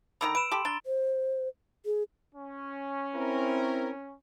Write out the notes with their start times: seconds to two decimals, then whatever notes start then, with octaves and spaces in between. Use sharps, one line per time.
0.21 D3 D#3 A#5 B5 E6 D7
0.35 B4 D7 E7
0.52 G4 A4 C6
0.65 D4 A#5 A6 G7
0.85 C5
1.86 G#4
2.34 C#4
3.16 C4 E4 A#4